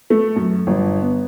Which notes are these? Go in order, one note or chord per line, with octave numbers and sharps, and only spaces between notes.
A3
F#2
G1
B3